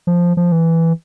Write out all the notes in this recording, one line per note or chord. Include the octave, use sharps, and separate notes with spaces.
F3
F3
E3